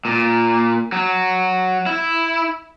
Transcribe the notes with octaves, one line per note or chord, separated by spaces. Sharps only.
A#2
F#3
E4